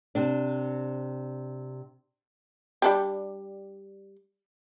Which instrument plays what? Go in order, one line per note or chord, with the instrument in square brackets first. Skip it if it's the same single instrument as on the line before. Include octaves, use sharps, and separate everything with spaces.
[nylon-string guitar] C3 D4
[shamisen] G3 D4 G4